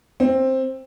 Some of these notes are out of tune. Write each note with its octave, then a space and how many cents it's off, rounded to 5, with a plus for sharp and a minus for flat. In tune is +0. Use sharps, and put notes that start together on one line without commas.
C4 +10